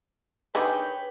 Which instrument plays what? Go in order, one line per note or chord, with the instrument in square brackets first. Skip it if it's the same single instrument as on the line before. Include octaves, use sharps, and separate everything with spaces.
[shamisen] D3 D#3 G#4 [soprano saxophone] B4 [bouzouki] C#5 F5 G5